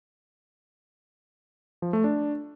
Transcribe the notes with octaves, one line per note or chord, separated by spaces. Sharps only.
F3
A3
D4